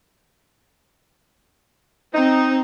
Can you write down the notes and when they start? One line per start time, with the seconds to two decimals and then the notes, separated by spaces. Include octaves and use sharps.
2.14 C4 D#4